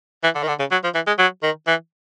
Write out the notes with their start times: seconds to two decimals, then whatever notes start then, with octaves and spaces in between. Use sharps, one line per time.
0.24 E3
0.35 D3
0.43 D#3
0.48 D3
0.60 C#3
0.72 F#3
0.84 F3
0.95 E3
1.07 G#3
1.19 F#3
1.43 D#3
1.67 E3